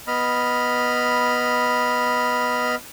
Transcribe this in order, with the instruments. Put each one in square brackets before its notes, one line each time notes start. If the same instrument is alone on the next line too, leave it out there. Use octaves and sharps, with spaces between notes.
[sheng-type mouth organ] B3 D#5 B5 F6